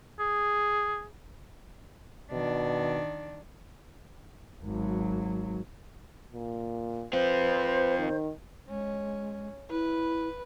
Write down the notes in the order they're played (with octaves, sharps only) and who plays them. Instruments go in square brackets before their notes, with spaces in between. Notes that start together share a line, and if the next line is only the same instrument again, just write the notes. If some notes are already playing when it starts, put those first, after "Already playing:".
[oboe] G#4
[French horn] B2 [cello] D#3 D4
[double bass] G#1 F#3
[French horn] A#2
[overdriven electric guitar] C4 F4 [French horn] B4 [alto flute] C5
[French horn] D#3
[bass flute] G#3 [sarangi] C#4
[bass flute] E4 [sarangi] B4